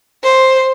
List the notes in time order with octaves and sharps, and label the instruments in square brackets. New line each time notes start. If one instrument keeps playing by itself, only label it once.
[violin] C5